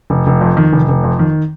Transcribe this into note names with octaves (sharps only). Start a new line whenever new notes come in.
F1
F1
F2
D#3
F1
F1
F2
D#3